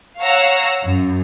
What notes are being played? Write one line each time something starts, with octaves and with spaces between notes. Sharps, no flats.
C#5 F5 F#5 A#5 E6
F#2